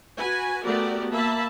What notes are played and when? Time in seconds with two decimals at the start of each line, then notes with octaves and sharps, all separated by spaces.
0.20 F#4 B4 G#5
0.65 A3 B3 F#4 G4 A#4 D5
1.12 A#3 E5 A5 B5